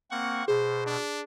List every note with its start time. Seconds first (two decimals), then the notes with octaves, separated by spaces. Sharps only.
0.11 A#3 C4 F#5 C#6
0.48 B2 G#4 C5
0.86 D4